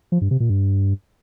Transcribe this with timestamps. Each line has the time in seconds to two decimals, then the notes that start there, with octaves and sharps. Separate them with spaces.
0.12 F3
0.21 G2
0.31 C3
0.40 A#2
0.50 G2